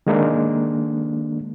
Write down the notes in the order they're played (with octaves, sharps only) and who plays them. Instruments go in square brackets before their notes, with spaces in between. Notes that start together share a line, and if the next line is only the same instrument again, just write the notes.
[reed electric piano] D#3 G#3 A#3 D4